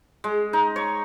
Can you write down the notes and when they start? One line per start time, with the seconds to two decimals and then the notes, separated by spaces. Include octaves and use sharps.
0.24 G#3
0.53 D#4
0.76 C#5